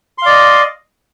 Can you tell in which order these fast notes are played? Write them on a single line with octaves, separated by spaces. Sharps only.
C6 F5 D5 D#5